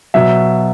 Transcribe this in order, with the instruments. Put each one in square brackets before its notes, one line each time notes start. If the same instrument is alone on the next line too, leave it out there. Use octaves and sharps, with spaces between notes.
[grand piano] B2 F#3 E5